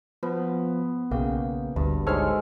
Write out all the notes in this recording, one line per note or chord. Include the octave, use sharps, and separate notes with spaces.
F3 B3
B1 C#3 A#3 G5
G#1 D2 G2
G#2 G#3 A4 C#5 F6